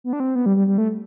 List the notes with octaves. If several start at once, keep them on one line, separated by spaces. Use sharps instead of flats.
B3
D4
C4
B3
G3
G3
G3
A3